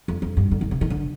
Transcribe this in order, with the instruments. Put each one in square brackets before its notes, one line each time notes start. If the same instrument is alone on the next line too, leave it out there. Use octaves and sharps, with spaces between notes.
[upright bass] F2
F2
G2
D3
D#3
C3
D#3
D3